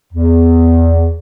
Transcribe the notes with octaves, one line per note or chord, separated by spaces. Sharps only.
E2